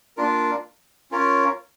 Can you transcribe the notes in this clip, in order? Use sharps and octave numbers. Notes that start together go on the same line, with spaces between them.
A#3 D4 F4 A#4
C#4 F4 A#4 C#5